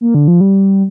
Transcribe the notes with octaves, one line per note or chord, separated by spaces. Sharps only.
A#3
D3
F3
G3